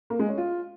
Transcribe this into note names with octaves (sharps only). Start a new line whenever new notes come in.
A#3
G#3
C#4
F4